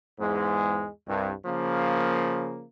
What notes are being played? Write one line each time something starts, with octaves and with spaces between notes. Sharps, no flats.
E2 G#2 G#3
C2 G2
C#3 F3 A#3